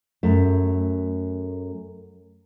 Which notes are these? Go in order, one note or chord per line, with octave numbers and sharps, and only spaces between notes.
F#2 A3